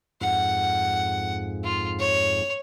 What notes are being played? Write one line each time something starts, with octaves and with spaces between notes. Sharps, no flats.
F2 G#2 F#5
F4
C#5